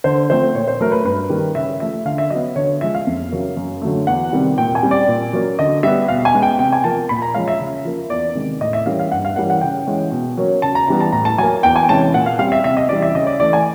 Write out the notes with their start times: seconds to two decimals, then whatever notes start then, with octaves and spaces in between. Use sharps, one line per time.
0.04 D3 C5
0.30 F3 A3 C4 C5
0.54 A#2 C#5
0.67 C5
0.80 F#3 A3 A#4
0.92 B4
1.04 G2 B4
1.30 D#3 G3 A#3
1.55 C#3 E5
1.80 F3 A3 E5
2.05 D3 F5
2.18 E5
2.30 F#3 D#5
2.35 B3
2.56 D3 C#5
2.81 F3 G#3 E5
2.95 F5
3.07 F2
3.32 C#3 F#3 A#3
3.57 F#2
3.82 D3 F#3 A3
4.07 E2 F#5
4.33 C3 D#3 G3 C4
4.58 A#2 G5
4.75 G#5
4.83 G3 C4
4.91 D5
5.08 A#2
5.33 F#3 A#3 C#4
5.59 D3 D#5
5.83 G3 B3 E5
6.08 B2 F5
6.25 G#5
6.34 G#3 B3
6.42 G5
6.59 C3 G5
6.73 G#5
6.84 F3 A#3 A5
7.09 A#2 B5
7.22 A#5
7.34 F3 G#3 C#4 F5
7.48 E5
7.60 C#3
7.85 F3 A#3
8.10 E2 D5
8.35 C3 D#3 G#3 B3
8.61 A2 D#5
8.73 E5
8.86 E3 G3 A#3 C#4 F5
8.99 F5
9.12 G2 F#5
9.25 F5
9.36 E3 G3 A#3 C#4 F#5
9.50 F#5
9.61 C#3 G5
9.87 E3 G#3 C#4
10.12 B2
10.37 F#3 A#3 C#4
10.62 C#3 A5
10.75 A#5
10.88 E3 G3 B3 A#5
11.00 A5
11.12 A2 A#5
11.25 A5
11.38 F#3 G#5
11.43 A#3
11.63 E2 G5
11.76 G#5
11.89 C3 E3 G#3 C#4 A5
12.14 A#2 F#5
12.26 F5
12.39 G3 C4 F5
12.52 E5
12.64 C3 E5
12.77 D#5
12.89 E3 G3 D5
13.02 E5
13.14 C#3 D#5
13.27 D5
13.40 E3 A3 D5
13.53 G#5